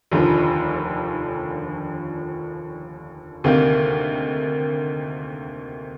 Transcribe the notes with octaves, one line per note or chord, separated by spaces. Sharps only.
F1 D#2 D3 F3
D2 C3 D#3 A#3